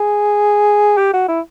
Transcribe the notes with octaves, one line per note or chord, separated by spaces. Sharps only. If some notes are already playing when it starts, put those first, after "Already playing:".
Already playing: G#4
G4
F#4
E4